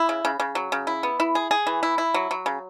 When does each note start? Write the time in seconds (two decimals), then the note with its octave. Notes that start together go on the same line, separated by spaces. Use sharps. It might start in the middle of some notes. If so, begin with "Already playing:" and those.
Already playing: E4
0.09 C#3
0.25 C#3
0.40 C#3
0.55 F#3
0.72 C#3
0.87 E4
1.03 B3
1.20 E4
1.35 G#4
1.51 G#4
1.67 E3
1.83 E4
1.98 E4
2.14 F#3
2.31 F#3
2.46 C#3